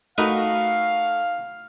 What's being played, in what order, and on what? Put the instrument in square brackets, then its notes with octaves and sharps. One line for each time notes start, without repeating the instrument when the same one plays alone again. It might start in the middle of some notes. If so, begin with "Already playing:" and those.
[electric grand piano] A3 F#4 [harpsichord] D#4 A#4 B4 [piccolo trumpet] F5